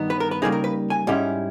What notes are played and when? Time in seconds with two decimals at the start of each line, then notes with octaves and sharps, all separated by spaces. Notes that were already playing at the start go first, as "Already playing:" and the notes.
Already playing: G2 D#3 B3 D#4
0.10 B4
0.20 A#4
0.31 B4
0.42 C#3 G3 A#3 D#4 G#4
0.52 A#4
0.64 B4
0.90 G#5
1.07 G#2 G3 C#4 E4